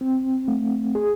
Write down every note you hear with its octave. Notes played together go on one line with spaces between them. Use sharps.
C4
A3
G#4